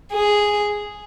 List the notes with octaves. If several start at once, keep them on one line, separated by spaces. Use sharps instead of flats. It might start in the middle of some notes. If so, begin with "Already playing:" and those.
G#4